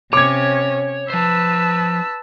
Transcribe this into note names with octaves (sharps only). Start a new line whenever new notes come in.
C3 C#4 C#5 D6 G#6
F3 B4 C5 A5 E6